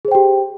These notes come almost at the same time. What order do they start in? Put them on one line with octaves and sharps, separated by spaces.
G#4 C5 G5 G4